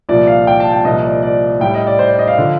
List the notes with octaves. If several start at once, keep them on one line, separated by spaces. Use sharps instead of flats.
C2 A#2 F3 D5
F5
G5
A5
G5
C2 A#2 F3 D#5
D5
D5
A2 G3 G5
D#5
D5
C5
D5
D#5
F5
D3 F3